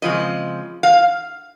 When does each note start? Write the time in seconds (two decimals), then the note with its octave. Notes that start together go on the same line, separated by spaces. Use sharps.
0.02 C#3 F3 G#3 C4 D#5
0.83 F5